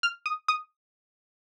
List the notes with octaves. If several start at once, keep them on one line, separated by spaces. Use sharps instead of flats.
F6
D#6
D#6